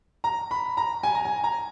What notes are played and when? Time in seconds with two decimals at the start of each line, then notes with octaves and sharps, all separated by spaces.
0.24 A#5
0.51 B5
0.77 A#5
1.03 G#5
1.15 A#5
1.25 G#5
1.44 A#5